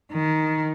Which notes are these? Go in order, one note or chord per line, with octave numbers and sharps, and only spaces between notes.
D#3